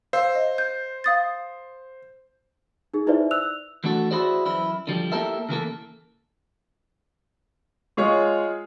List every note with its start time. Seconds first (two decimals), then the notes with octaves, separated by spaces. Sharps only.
0.13 C5 F5 E6
0.35 D#5
0.58 G6
1.04 F5 D#6 A6
2.94 D#4 G#4
3.07 D#4 E4 B4 C5 D5 E5
3.31 E6 F#6 F7
3.84 E3 A3 D4 F#4 A4
4.11 E4 F#4 G#4 C5 D5
4.46 F#2 E3 E4
4.87 D3 F3 G3
5.12 A#3 E4 G4 A4 A#4 E5
5.49 C#3 E3 A#3 A4
7.97 G#3 F4 G#4 C#5